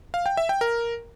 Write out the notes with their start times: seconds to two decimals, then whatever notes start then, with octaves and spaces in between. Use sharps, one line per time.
0.14 F5
0.26 G5
0.37 E5
0.49 G5
0.61 A#4